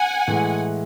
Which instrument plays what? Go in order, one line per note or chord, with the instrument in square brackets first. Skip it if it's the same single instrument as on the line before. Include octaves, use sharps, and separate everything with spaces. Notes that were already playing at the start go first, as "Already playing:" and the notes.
Already playing: [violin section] F#5 G#5
[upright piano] A2 E3 G#3